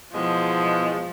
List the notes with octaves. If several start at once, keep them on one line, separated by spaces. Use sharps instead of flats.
E2 B2 F3 G#3